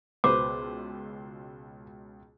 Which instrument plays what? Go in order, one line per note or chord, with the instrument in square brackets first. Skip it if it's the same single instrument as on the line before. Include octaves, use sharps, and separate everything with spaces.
[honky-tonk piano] C#2 B2 [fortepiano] B4 C5 [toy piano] D6